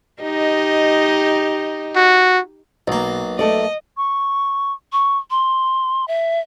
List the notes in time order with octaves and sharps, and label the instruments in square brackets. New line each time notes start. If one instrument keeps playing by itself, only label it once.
[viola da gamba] D#4 G4 D#5
[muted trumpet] F#4
[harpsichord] B1 A#3 [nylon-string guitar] B2
[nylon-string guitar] A3 A4 D5 [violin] D#5
[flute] C#6
[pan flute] C#6
C6
E5